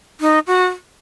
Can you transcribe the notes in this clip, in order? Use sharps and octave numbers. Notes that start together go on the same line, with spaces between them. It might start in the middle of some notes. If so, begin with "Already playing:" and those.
D#4
F#4